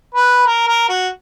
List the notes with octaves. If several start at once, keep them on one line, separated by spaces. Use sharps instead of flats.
B4
A#4
A#4
F#4